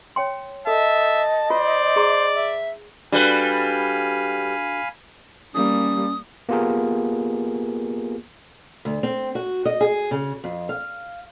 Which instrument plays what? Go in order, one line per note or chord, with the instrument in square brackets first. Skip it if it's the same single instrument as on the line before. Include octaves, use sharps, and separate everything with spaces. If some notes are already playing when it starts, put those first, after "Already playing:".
[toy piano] C#5 G5 C6
[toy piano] A4 [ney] D#5 [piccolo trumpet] E5 [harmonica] A5
[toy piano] F4 [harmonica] C5 [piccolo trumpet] D5
[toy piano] G#4 A#5 C6
[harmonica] E5
[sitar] G3 B4 [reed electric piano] D4 F#4 A4 [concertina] F5 G#5 B5
[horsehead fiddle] G3 A#3 [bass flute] C#4 [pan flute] D#6
[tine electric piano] A#3 B3 F4 G4 G#4 A#4
[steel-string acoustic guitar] D2
C4
F#4
D#5
G#4
C#3
F2
F5